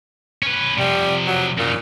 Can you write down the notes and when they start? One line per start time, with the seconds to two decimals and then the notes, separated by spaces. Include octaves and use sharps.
0.43 C#4 B4
0.78 C3 F3 G3
1.27 F#3
1.58 F#2 A#2 D#4